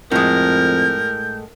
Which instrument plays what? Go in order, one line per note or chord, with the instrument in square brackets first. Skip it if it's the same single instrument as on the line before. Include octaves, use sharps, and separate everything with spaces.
[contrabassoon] F2 [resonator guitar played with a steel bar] A2 G#3 [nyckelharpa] A#4 [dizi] G6